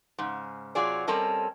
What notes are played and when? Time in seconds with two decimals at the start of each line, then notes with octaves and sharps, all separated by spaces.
0.18 G#2 C#3
0.75 C3 F#3 F4 G#4 D5
1.07 G3 C4 C#4 A4 A#4 D#5